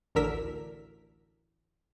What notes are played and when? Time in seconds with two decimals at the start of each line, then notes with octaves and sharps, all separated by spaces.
0.15 A1 D2 D3 A#4 E6 B6